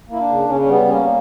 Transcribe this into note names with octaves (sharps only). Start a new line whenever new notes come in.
A#3 E4
D4
C#3
C#3 C#4
C#4
G3 B3
A#3 C#4